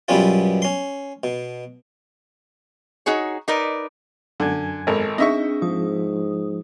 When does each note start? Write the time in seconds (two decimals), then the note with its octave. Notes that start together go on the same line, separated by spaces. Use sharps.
0.08 F#2 B2 G3 B3 C#4 F4
0.62 C#4 C6
1.24 B2
3.06 D#4 F#4 G#4 C#5
3.48 D#4 A#4 B4 D5
4.40 F#2 D3 G#5 G#6
4.87 G#1 A4 A#4
5.18 C4 D4 D#4 G#4 D#5 E5 C#6
5.62 G#2 F3 D#6